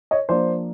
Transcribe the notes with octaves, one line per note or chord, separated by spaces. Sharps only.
C#5 D#5
F3 A#3 D4 C5 D5